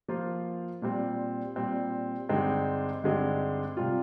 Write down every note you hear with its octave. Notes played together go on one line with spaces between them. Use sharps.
F3 A#3 F4 C5
A#2 G3 C4
A#2 G3 C4
G2 D3 G#3 C4 D#4
G2 D3 G#3 C4 D#4
C3 G3 C4 F4